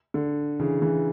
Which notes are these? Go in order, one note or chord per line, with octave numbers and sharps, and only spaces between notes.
D3
C#3 E3
C#3 E3